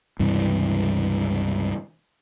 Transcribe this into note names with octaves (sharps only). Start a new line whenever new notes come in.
C#2 G2 C3 E3